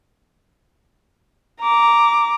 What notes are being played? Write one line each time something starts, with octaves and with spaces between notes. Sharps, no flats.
A#5 D6